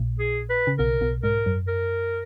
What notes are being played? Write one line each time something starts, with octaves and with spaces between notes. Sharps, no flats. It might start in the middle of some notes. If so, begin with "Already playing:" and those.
Already playing: A#1 A#2
G#4
B4
C#3
B1 B2 A#4
B1 B2
G#2 A#4
F#2
A#4